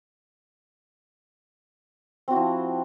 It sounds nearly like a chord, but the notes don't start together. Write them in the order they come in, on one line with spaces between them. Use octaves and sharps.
C4 F#4 E4 F3